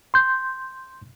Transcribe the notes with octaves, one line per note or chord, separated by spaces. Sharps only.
C6 G6